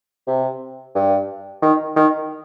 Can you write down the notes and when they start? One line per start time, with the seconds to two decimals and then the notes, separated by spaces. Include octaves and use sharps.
0.27 C3
0.95 G2
1.62 D#3
1.96 D#3